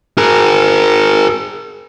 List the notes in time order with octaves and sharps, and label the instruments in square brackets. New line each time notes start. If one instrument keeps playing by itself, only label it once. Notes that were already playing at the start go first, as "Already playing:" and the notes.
[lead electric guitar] G#4 A#4